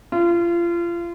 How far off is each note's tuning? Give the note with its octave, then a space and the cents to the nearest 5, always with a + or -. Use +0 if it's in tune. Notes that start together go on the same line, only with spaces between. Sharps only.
F4 -30